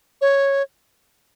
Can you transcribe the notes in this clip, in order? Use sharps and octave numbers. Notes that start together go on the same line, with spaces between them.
C#5